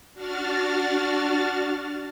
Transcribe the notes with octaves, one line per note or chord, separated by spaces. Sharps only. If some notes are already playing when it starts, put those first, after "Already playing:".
D4 F#4 F6 A6